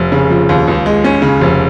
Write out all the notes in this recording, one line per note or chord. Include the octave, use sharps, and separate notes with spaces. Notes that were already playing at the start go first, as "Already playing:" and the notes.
Already playing: F1
C#3
F3
D#2
C#2
G#3
C#4
C#3
F1